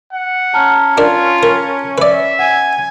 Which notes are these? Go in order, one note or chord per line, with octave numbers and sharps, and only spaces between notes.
F#5
C#4 A5 A#5 F6
D4 F4 A#4
A#4
B4 D5 E5
F#5 G#5